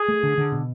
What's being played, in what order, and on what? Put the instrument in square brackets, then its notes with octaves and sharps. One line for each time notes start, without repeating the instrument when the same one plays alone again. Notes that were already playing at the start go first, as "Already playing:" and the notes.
Already playing: [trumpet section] G#4
[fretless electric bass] A3
D3
D3
B2